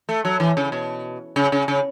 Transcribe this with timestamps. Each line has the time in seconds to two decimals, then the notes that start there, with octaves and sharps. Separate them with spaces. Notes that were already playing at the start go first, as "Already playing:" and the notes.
0.09 A3
0.25 F#3
0.40 E3
0.57 C#3
0.72 B2
1.36 C#3
1.52 C#3
1.68 C#3